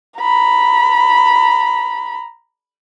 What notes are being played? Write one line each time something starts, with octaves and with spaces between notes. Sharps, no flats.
A#5 B5